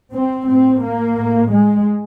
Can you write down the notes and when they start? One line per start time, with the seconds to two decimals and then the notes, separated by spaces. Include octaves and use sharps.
0.12 C4
0.48 A2 C4
0.82 A#3
1.17 A2
1.51 G#3